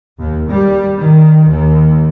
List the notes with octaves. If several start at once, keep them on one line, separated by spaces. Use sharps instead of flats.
D#2
G3
D#3
D#2